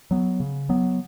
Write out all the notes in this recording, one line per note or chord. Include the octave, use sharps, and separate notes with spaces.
F#3 B3
C#3
F#3 B3